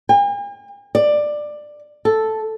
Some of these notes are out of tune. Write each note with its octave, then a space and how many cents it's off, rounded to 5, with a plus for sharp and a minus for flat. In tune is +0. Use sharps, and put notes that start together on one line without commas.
G#5 -45
D5 +15
A4 +0